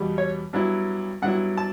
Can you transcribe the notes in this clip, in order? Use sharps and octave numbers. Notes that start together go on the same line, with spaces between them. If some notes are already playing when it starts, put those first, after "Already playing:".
Already playing: E2 B2 G3
C#5
G2 F#3 B3 E4
G2 F#3 B3 E4 F#5
A5